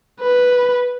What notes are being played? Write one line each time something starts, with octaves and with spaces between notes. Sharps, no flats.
B4